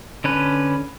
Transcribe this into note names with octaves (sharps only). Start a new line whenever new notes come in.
D3 C#4 B4